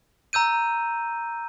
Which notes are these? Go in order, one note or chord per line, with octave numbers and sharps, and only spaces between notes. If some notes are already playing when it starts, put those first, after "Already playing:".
A#5 E6 G6 D#7